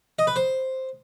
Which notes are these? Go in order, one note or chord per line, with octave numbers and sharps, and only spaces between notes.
D#5
B4
C5